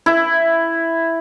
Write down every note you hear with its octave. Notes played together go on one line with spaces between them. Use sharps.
E4